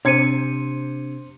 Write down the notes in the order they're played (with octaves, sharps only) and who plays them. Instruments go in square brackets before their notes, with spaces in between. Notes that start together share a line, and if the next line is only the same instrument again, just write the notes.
[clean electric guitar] C3 [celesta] D4 C#7 D#7 [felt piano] C5 G#6